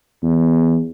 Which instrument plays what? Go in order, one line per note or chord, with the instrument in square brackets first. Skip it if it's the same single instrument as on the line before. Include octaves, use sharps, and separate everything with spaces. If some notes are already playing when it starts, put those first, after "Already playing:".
[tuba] E2